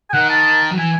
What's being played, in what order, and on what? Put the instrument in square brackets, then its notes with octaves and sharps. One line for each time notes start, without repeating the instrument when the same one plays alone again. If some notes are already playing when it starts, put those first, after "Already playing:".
[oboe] G#5
[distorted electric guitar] D#3 [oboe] F#5
[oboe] A5
[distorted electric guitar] F#3
[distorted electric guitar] E3 [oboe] G#5